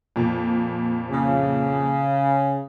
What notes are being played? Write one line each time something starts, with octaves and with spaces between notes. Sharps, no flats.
F2 A#2
C#3